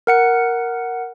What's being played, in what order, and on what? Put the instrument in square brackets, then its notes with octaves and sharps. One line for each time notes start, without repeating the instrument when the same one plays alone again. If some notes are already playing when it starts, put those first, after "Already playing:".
[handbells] A#4 F#5 C#7